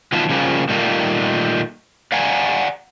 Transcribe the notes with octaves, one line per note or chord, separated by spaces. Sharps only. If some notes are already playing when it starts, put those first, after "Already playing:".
D#3 F#3 B3 F4 B4 A5
C#3 F3 G3 A#3
A#2 D#3 G3 A3 A#3
D5 F5 F#5 G#5 A#5